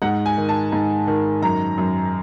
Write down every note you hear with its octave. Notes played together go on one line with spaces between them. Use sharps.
G#2 F#5
G#5
D#3
A5
G#2
D#3
F#2 A#5
F#2